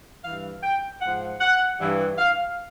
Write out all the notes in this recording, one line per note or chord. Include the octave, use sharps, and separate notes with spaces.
G2 E3 F5
G5
G#2 F3 F#5
F#5
G2 E3
F5